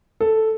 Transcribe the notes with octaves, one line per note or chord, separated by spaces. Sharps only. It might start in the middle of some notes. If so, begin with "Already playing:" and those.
A4